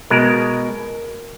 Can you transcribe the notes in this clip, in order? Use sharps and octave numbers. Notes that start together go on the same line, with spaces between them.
B2 G#3 A#4